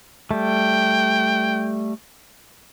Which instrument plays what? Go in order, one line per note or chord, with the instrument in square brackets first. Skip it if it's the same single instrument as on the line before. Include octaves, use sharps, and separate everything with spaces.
[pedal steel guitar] G3 A3 [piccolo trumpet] G5